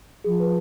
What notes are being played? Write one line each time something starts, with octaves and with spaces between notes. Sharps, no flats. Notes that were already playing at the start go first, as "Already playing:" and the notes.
F3 G#4
B4